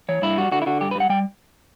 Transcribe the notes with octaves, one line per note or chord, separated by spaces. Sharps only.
E3 C#5
G2 E4
G3 F#4
D3 F#4
E4
D3 F#4
G2 G4
B4
G3 F#5
G3 G5